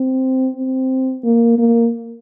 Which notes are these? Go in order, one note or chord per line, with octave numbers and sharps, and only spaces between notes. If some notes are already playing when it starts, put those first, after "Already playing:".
Already playing: C4
C4
A#3
A#3